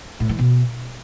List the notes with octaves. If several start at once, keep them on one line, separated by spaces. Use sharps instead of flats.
A2
E3
B2